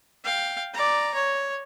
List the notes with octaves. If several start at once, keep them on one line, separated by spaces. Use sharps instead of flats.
F5 G5
D5 A#5
C#5